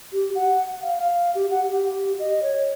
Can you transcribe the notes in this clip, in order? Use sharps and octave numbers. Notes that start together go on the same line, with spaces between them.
G4
F#5
F5
F5
G4
F#5
G4
D#5
C#5